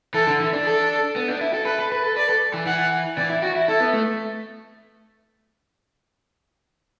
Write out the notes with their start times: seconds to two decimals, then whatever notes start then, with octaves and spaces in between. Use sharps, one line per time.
0.14 E3 A4
0.27 D3
0.41 E3
0.53 D4
0.65 A4
1.16 B3
1.28 D4
1.41 E4
1.54 A4
1.66 A4 B4
1.79 A4
1.92 B4
2.03 A4
2.17 B4 D5
2.29 A4
2.54 E3
2.66 E3 F#5
3.17 E3 D5
3.30 E4
3.42 F#4
3.56 E4
3.68 E4 A4
3.80 B3
3.93 A3